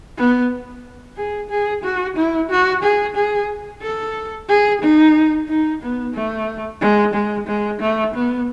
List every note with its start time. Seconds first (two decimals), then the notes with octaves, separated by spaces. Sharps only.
0.18 B3
1.17 G#4
1.50 G#4
1.83 F#4
2.16 E4
2.50 F#4
2.83 G#4
3.16 G#4
3.82 A4
4.49 G#4
4.82 D#4
5.48 D#4
5.82 B3
6.14 A3
6.81 G#3
7.14 G#3
7.47 G#3
7.80 A3
8.14 B3